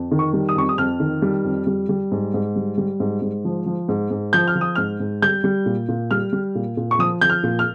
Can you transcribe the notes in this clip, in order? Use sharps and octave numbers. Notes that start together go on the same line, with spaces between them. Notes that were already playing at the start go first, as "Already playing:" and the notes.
Already playing: F2
D#3
C#6
G3
D#6
F2 C#6
D#6
F2 F6
D#3
G3
F2
G3
G3
G#2
G#2
G3
G3
G#2
G#2
F3
F3
G#2
G#2
F3 G6
F6
F3
D#6
G#2 F6
G#2
G3 G6
G3
A#2
A#2
G3 F6
G3
A#2
A#2
C#6
F3 D#6
F3 G6
F6
A#2
F6